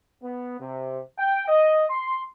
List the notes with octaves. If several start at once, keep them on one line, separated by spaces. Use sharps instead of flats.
B3
C3
G5
D#5
C6